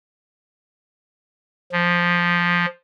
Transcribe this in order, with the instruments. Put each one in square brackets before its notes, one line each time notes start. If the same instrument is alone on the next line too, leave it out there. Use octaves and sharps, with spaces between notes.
[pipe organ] F3